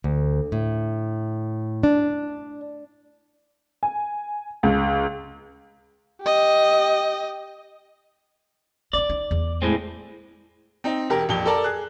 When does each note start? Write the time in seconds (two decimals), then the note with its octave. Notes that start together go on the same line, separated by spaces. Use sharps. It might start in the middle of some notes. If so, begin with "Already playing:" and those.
0.04 D2
0.52 A2
1.83 D4
3.83 G#5
4.63 C#2
6.22 G4 D#5
8.93 D#4 E4 D5
9.09 D#4
9.31 E2
9.62 A2 G#3 C4
10.84 C4 D#4
11.10 E1 G4 A#4
11.29 A#1 F2 G4 G7
11.46 A4 A#4 D5 A5 A#5
11.64 G#4 F#6